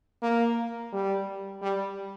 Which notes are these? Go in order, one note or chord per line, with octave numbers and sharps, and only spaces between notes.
A#3
G3
G3